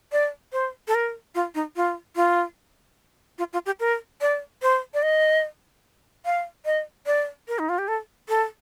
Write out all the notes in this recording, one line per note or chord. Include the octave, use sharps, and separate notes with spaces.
D5
C5
A4
A#4
F4
D#4
F4
F4
F4
F4
G4
A#4
D5
C5
D5
D#5
F5
D#5
D5
A#4
D#4
F4
G4
A4
A4